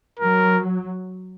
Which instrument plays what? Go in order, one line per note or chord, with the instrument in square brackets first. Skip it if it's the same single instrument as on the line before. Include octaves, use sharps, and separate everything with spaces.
[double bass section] F#3 [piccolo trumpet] A#4